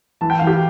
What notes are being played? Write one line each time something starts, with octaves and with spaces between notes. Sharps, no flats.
E3 A5
G5
E3 F5
G4 G5